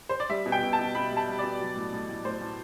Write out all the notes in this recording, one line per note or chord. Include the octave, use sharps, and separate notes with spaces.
C5
D5
G3 E5
B2
G5
B2
A5
B2
B2 B5
G3
A5
G3
B2 D5
F#3
A2
A2
A2
A2 C5
A2